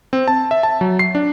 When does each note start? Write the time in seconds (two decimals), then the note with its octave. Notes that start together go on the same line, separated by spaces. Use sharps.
0.13 C4
0.28 A5
0.51 E5
0.63 A5
0.81 F#3
0.99 C7
1.15 D4